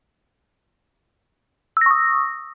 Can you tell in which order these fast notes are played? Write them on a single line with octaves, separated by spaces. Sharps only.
E6 A#6 C#6 D#6